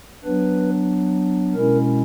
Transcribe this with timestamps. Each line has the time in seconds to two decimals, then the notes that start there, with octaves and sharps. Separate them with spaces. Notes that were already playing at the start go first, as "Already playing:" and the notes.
0.24 F#3 B3 D4 B4
1.54 B2 G#3 C#4 E4 A#4